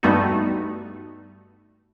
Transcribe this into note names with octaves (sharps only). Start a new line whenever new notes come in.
G2 G3 A3 B3 D#4 F#4